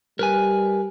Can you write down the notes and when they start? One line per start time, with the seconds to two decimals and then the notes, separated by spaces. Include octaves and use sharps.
0.19 G3 A#4 B4 G#5